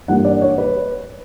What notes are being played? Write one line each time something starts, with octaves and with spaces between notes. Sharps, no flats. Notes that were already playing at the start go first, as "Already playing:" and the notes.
G2 E3 A#3 E4 F#5
D5
C#5
B4